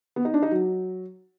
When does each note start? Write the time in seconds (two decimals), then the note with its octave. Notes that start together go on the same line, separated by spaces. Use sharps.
0.16 B3
0.25 D#4
0.34 D4
0.43 D#4
0.51 F#3